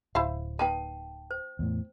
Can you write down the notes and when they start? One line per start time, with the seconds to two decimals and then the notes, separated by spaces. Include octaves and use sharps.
0.15 D1 E4 C5 F5
0.59 A#3 D#4 B4 G5 A5
1.31 C5
1.59 E2 A2